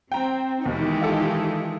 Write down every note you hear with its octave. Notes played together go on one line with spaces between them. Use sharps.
C4 G5 A#5
D#2 B2 D#3 E3 G#3 D#4 G4
F4 A4